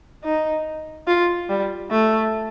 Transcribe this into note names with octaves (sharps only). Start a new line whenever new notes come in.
D#4
F4
G3
A3